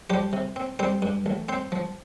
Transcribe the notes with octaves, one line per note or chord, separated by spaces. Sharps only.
F3 G3 G4
C3
C4
G3 C4 C5
G2
A1
C4 C5
F3